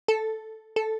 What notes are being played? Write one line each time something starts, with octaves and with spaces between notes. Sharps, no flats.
A4
A4